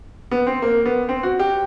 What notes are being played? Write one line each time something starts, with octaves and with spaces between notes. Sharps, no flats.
B3
C4
A#3
B3
C4
F#4
G4